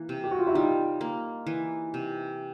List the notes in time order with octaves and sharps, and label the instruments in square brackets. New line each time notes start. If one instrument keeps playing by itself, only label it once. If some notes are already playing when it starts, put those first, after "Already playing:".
Already playing: [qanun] E3 A#3
C3
[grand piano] G4
F#4
F4
E4 F#4
[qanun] G3 [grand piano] D#4 F4
[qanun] A#3
E3
C3